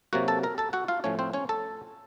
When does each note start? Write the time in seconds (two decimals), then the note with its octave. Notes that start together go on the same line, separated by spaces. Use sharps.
0.13 C3 F#3 A#3 F#4 F#5
0.28 A4 A5
0.43 A#4 A#5
0.58 A4 A5
0.73 F#4 F#5
0.88 F4 F5
1.04 A2 F3 A3 C#4 C#5
1.19 C4 C5
1.33 C#4 C#5
1.49 A4 A5